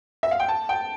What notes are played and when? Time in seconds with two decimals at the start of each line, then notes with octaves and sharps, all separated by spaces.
0.23 E5
0.31 F5
0.40 G5
0.48 A5
0.69 G5